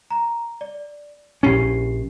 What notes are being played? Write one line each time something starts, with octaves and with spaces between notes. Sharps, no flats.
A#5
D5
A#1 C#4 E4 G4 C7